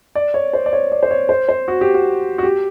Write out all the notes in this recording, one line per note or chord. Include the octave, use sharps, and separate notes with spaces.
D5
C#5
C5
D5
C#5
D5
C5
C#5
C5
C5
F#4
G4
F#4
F#4
G4